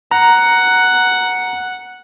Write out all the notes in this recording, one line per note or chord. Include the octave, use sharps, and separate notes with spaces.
F#5 A#5